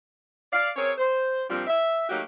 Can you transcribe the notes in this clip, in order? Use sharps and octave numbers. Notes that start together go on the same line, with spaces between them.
D5 F5
C4 G#4 A#4 C#5
C5
A#2 F3 G3 C4 D4 F4
E5
F#3 A3 A#3 D#4 F#4 G4